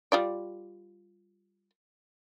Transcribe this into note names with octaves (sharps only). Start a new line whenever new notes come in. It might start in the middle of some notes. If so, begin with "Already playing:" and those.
G3 F4 D5